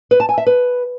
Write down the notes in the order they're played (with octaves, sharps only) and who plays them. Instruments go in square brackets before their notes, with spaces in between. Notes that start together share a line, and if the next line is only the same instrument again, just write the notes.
[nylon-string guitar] B4
A5
G#5
E5
B4